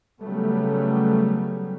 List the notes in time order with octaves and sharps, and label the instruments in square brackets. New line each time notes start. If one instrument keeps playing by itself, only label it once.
[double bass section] C#3 F#3 G3 A3 B3